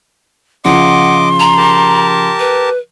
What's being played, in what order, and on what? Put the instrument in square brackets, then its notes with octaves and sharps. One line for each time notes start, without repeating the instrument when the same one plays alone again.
[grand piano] C#3 F3 [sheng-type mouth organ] D#5 D6 [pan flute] F#5 [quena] C6
[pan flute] A#5
[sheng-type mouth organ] G4 A#4 A5
[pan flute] B4